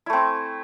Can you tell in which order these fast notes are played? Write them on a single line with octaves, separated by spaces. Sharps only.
E4 A3 C4